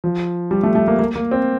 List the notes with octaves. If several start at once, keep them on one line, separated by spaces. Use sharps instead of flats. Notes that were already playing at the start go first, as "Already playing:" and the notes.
F3
G3
A3
A3
A#3
A#3
A#3
C4